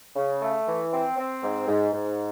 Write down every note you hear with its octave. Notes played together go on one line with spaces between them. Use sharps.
C#3
A3
E3
C4
C4
G#2
G#2
G#2